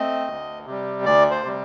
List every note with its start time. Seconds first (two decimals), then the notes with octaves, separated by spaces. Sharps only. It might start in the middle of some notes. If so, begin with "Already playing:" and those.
Already playing: A3 C4 D#5
0.28 D2
0.66 C3 G3
1.04 D2 D5
1.31 C5
1.44 C3 G3